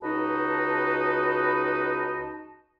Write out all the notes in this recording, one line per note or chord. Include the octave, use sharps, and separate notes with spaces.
C#2 D#4 F#4 B4 D#5 A5